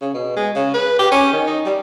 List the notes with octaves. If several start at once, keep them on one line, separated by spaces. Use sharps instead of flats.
C#3
B2
G#3
C#3
B4
G4
C#4
D#3
D#4
G3